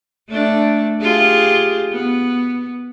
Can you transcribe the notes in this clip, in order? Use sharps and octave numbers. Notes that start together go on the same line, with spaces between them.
A3 D4
F4 G4 G#4
B3